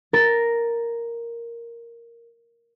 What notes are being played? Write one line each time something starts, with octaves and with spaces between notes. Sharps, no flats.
A#4 A6